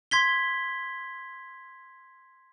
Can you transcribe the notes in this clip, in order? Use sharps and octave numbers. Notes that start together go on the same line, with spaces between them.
C6 G#6 B6 G7